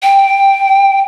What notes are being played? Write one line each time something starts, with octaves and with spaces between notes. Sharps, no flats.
G5